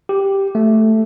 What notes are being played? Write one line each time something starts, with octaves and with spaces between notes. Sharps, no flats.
G4
A3